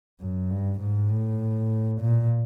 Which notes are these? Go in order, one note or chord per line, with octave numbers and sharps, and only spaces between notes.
F#2
G2
G#2
A2
A#2